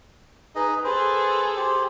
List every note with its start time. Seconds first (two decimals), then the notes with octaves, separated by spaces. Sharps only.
0.55 D#4 G#4 B4 D#5
0.84 G#4 A4 B4 C5
1.56 G4 C5